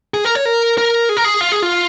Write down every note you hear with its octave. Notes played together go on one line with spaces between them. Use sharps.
G#4
A#4
C#5
A#4
A#4
G#4
A#4
G#4
F4
G#4
F4